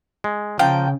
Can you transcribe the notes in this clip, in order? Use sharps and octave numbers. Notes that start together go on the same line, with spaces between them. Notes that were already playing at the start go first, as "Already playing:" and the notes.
G#3
C#3 F3 F5 G5 A5 A#5